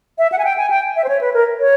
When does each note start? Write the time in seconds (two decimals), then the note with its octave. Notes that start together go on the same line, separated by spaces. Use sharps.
0.18 E5
0.32 F#5
0.39 G#5
0.45 G5
0.58 G#5
0.70 G5
0.96 E5
1.04 C5
1.09 C#5
1.21 B4
1.34 A#4
1.60 C#5